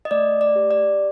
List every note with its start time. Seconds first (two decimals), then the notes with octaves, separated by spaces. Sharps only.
0.05 D#5
0.11 A3 D5
0.41 D5
0.56 G4
0.71 D5